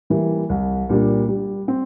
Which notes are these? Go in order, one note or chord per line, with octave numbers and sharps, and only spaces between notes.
E3 G3 A#3
C2
A#2 G3 A#3 D4
G3
C4